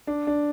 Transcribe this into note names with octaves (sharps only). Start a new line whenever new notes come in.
D4
D4